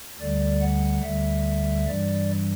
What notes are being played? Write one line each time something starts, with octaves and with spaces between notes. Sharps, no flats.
D2 D3 G3 D5
F#5
D2 D3 G3 E5
G2 E3 G3 D5